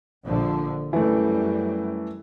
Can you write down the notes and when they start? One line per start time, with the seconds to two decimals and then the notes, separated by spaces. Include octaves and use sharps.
0.25 A#1 D3 F3
0.93 F#2 E3 G3 A3